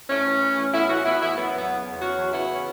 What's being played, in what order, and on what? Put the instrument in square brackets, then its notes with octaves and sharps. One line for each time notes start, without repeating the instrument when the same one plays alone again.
[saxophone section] A2 A3 C#4
E3
E3
A2
A2 B3 E4
E3 C#4 F#4
E3 B3 E4
A2 B3 E4
F#3 B3
E2 B3
C#3
E2
F#3 C#4 F#4
E2
C#3 B3 E4
C#4